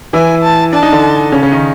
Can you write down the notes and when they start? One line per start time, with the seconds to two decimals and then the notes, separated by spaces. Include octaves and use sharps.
0.13 E3 E4 G#5
0.43 A5
0.73 D4 A5
0.83 D#4
0.92 D3 D4
1.32 C#3 C#4
1.42 C#3 C#4
1.52 D#3 D#4